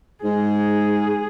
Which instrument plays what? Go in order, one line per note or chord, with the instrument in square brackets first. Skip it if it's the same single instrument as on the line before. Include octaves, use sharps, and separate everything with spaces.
[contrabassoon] G#2 [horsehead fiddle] G#4